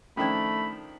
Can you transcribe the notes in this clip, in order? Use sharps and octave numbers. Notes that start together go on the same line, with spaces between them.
D#3 F3 A3 C#4 D4 G5 B5 G#6